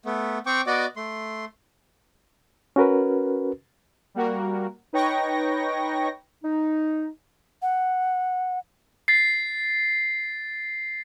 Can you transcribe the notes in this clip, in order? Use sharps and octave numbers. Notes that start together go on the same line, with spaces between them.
A3 B3
C4 G5 C#6 D6
B3 F#4 D5 D#5 D6
A3 C6
C#4 F#4 A#4 B4
G3 A#3 F#4 A#4
D#4 B4 C#5 G5 C#6 A#6
D#4
F#5
A6 C7